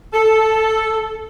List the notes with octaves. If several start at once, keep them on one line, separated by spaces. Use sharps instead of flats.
A4